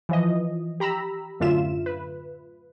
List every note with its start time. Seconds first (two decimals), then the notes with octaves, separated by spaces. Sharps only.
0.09 E3 F3 D#5
0.80 G4 A#5 B5 E6
1.40 F#2 A2 D3 F4 E5 E7
1.86 B4